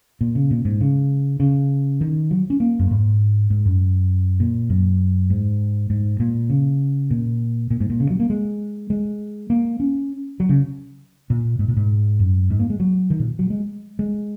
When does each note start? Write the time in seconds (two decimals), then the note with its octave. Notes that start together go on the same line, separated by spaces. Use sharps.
0.21 A#2
0.35 C#3
0.51 A#2
0.65 G#2
0.81 C#3
1.40 C#3
2.01 D#3
2.31 F#3
2.50 C#4
2.60 A#3
2.79 F#2
2.91 G#2
3.50 G#2
3.66 F#2
4.40 A#2
4.70 F#2
5.30 G#2
5.90 G#2
6.20 A#2
6.50 C#3
7.11 A#2
7.70 A#2
7.80 G#2
7.90 A#2
8.00 C#3
8.11 F#3
8.20 A#3
8.30 G#3
8.90 G#3
9.50 A#3
9.80 C#4
10.40 F#3
10.49 C#3
11.30 A#2
11.59 G#2
11.68 A#2
11.77 G#2
12.19 F#2
12.50 G#2
12.59 A#3
12.70 G#3
12.80 F#3
13.10 D#3
13.20 A#2
13.39 F#3
13.50 G#3
13.99 G#3